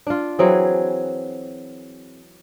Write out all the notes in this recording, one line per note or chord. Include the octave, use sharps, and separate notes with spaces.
D4 F4
E3 F#3 C4 G#4